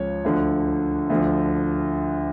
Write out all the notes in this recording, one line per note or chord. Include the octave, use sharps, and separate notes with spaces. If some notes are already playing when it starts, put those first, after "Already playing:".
Already playing: C#2 C#3 F3 C#5
D2 D3 F3
D2 D3 F3